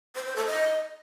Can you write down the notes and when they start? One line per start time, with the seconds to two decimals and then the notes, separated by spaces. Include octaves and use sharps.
0.15 C5
0.26 C5
0.36 A4
0.46 D#5